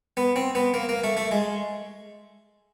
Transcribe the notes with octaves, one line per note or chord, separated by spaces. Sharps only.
B3
C4
B3
A#3
A#3
A3
A3
G#3